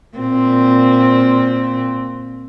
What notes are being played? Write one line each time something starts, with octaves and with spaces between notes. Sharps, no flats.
A#2 C4